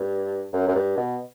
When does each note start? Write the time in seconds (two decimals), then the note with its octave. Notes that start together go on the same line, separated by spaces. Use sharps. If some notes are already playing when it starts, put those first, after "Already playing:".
Already playing: G2
0.53 F#2
0.68 F#2
0.75 G2
0.97 B2